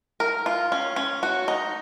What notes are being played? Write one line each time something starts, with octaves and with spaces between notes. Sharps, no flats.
A#4
F4
C#4
C#4
F#4
D#4